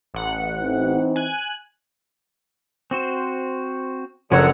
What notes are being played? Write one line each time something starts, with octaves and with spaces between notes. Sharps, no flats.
A1 F#5
E3 C4 D#4
G#5 F#6
C4 F#4 C5
F#1 D3 F3 F#4 C#5 F#5 E6